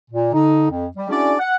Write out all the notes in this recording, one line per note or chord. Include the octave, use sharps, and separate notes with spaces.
A#2
D3 D#4
F2
G3
C#4 D4 E4 F#4 G#4 D5
F#5